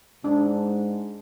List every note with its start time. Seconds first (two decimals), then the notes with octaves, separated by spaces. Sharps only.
0.24 G#2 D4